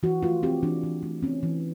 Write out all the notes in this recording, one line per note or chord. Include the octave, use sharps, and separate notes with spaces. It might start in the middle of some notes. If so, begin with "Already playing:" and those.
E3 F#4
A3 F4
C4 G4
E3 D4
E3
A3
C4 C#4
E3